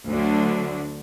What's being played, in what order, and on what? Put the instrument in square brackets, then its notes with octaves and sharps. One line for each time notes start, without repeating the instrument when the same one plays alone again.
[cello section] D2 D3 F#3 D4